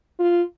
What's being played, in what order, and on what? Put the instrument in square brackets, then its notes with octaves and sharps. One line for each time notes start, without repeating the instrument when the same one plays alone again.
[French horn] F4